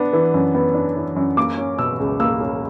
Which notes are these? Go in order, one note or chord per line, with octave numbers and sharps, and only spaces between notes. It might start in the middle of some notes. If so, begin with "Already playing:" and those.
Already playing: B3 D4
E3
F#2
B3
D4
E3
F#2
A#3 D6
C#4
B2 E6
C#2
A#3 E6
C#4